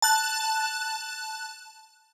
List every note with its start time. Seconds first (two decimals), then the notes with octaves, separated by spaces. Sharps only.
0.02 A5 F#6